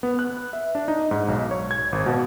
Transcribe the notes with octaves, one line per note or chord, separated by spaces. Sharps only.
B3
F#6
E5
D4
D#4
G#2
B1
C#5
G#6
G#1
B2